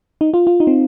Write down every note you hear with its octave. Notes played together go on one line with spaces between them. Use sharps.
D#4
F4
F4
D#4
C4